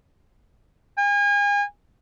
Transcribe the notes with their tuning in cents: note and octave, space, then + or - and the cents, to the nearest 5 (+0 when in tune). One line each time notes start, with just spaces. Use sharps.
G#5 -35